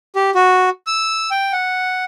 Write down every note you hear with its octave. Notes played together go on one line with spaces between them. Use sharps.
G4
F#4
E6
G5
F#5